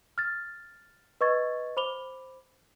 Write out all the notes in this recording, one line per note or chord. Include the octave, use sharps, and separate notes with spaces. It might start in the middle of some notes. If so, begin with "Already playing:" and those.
F6 A6
B4 D#5 C#6 G#6 A6
C5 B5 D6 F7 G7